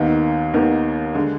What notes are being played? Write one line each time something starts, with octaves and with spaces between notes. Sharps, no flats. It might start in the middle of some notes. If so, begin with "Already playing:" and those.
Already playing: D#2 D#3 B3 D#4
D#2 D#3 B3 D#4
D3 G#3